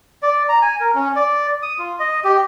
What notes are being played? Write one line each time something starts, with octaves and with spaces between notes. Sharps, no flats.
D5
A#5
G#5
A#4
C#4
D5
D#6
F4
D#5
G4